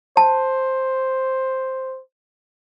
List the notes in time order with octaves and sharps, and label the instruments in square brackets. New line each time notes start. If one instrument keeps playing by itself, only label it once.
[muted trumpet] C5 [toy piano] A5